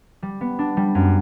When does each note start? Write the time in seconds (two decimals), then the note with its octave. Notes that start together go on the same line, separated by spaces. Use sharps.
0.22 G3
0.41 B3
0.59 D4
0.77 G3
0.95 F#2